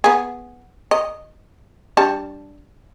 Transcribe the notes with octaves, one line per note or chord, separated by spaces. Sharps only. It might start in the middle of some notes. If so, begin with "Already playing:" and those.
B3 G#4
D#5
G3 D4 A5